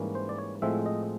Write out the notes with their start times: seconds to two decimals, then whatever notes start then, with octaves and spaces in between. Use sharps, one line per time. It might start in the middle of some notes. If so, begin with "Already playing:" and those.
Already playing: G#2 E3 G3 A#3 C#4
0.15 C5
0.29 D5
0.38 C#5
0.62 A2 F3 G#3 C4 E5
0.86 D#5